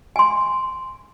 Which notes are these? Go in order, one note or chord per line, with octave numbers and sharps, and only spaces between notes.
G#5 C6